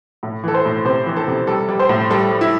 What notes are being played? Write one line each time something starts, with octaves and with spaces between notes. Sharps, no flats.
A2
E3 A4
C5
A2
C3 C5
E3
A4
C3
G3 A4
G3
C5
A2
G3 A4
G3
E4